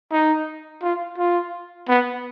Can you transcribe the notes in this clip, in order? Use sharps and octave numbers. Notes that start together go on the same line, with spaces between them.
D#4
F4
F4
B3